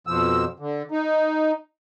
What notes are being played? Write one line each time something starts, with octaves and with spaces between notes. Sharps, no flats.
F2 B2 F3 E6
D3
D#4